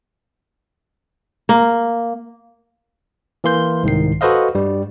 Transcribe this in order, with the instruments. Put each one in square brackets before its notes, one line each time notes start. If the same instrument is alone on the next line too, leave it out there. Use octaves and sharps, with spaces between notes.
[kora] A#3
[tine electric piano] E3 A#3 C6 G6
C2 G#2 D#3 C7
F#4 A4 B4 C5 D#5 F5
G2 G3